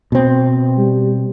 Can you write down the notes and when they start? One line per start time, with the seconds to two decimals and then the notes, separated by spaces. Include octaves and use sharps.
0.12 B2 C4
0.78 G3